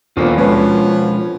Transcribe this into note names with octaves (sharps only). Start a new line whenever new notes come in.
G1 D#2 A#2 B3 F4 A4 C5
B2 F3 G#3 C#4 B4